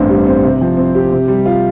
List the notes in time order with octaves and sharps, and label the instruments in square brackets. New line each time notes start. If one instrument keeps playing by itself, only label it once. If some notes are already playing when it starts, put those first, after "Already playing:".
Already playing: [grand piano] A1 G2 C4
G3
C4
C3
F3
C4
G4
C3
G3
F4